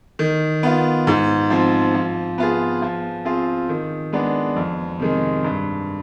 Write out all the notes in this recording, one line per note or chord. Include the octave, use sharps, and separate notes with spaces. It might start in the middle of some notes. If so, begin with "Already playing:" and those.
D#3
B3 F4
G#2
F3 C4
F3
B3 F4 G#4
F3
C4 F4 G#4
D#3
G#3 B3 D4
F2
C3 D#3 G#3
G2